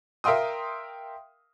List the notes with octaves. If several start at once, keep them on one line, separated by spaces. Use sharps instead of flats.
A#4 E5 F5 G5 C6 D#6